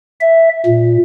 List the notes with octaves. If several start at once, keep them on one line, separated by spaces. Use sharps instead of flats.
E5
A#2